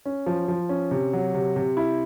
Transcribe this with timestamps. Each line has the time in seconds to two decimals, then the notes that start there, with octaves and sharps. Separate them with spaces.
0.05 C#4
0.26 F3
0.48 F3
0.69 C#4
0.91 C3
1.13 F#3
1.34 C3
1.56 C3
1.77 E4